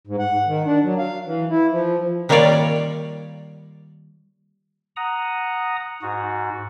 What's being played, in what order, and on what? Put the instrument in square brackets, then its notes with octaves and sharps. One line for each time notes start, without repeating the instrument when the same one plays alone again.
[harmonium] G#2
F#5
D#3
D4
F#3
F5
E3
E4
F3
[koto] D#3 G3 A#3 F4 C#5 D5
[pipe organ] F#5 A#5 D#6
G#2 F#4